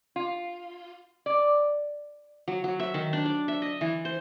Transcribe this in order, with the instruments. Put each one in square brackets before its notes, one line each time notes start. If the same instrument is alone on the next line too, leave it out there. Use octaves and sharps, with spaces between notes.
[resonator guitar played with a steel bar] F4
D5
[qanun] F#3
F#3
E5
D#3
D4
D5
E5
D#5
E3
C5